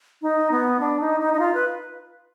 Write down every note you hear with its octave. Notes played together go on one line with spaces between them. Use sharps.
D#4
B3
D4
D#4
D#4
D#4
F4
B4